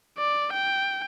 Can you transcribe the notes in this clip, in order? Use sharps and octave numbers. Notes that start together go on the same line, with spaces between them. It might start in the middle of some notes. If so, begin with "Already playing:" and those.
D5
G5